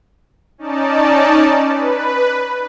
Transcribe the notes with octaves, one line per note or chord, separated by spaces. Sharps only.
C#4 D#4 D5 A5
B4